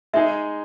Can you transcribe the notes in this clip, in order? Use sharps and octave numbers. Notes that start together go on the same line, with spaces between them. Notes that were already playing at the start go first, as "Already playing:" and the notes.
G#3 D#4 G#4 E5